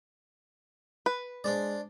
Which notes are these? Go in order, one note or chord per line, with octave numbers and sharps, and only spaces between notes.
B4
G#3 D4 C5 D5